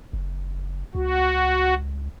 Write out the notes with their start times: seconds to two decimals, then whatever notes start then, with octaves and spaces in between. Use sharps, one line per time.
0.13 F#1
0.95 C#2 F#4